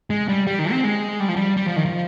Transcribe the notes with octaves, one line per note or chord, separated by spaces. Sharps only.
G#3
G3
G3
D#3
C4
G#3
G3
F3
G3
G3
F3
D#3
F3